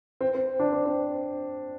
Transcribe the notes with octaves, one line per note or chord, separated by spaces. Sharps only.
C4
C4
D4
C4
C4